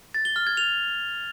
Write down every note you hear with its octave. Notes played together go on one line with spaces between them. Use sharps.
A6
G7
F6
G#6
F7